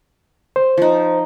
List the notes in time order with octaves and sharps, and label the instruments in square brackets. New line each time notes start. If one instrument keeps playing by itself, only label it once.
[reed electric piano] C5
[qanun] F3 D#4